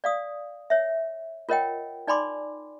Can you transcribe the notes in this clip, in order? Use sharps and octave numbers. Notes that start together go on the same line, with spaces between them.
D5 F5 D#6
C#5 E5
F4 A#4 C#5 D#5 F#5 G5
D#4 D5 G#5 B5 C6 D6